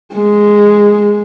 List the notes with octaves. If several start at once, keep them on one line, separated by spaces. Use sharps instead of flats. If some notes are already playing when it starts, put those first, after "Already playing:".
G#3